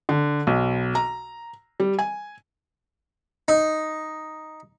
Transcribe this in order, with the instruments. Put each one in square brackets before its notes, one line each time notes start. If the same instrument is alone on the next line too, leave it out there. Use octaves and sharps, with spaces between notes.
[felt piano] D3
B1
A#5
G3
G#5
[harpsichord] D#4